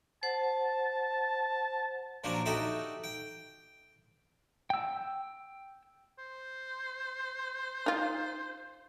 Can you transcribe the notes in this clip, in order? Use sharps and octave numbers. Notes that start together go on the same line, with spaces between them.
C5 F#5 A5
A#2 F3 F#3 D4
D#4 F#4 G4 A4 E5
G5
G5 E6
C5
D#4 F4